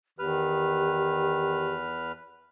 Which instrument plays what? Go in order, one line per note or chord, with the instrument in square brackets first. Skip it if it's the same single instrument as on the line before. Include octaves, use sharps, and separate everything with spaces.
[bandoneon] E2 B4 F6 [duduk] D#3 [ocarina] G4